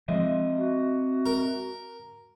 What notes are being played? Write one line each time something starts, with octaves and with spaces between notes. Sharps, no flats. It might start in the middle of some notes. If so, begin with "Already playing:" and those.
F3 G#3 C4 D#5 E5
F#4
A#4